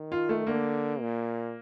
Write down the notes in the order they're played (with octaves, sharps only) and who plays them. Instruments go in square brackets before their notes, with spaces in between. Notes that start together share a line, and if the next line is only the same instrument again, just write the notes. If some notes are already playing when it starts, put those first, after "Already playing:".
Already playing: [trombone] D#3
[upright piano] F4
A3
[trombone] D3 [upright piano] A#3
[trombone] A#2